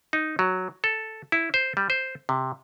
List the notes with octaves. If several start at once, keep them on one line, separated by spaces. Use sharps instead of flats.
D#4
F#3
A4
E4
C5
G3
C5
C3